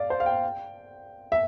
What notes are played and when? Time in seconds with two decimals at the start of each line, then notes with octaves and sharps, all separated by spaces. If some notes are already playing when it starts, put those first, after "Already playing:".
Already playing: D5 F5
0.10 C5
0.20 F5
0.26 G5
1.32 E5